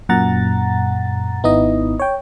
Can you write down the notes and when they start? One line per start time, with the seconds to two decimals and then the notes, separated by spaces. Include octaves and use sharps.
0.09 F#2 A#2 F#5 A#5 A6
1.43 G#1 B3 D#4 E4 D#5
2.00 C#5 G5